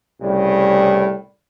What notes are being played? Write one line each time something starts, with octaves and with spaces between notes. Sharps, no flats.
C2 A2 C#3 G3